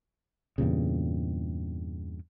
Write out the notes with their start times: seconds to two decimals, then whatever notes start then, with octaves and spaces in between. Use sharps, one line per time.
0.58 E2 G2 A#2 C#3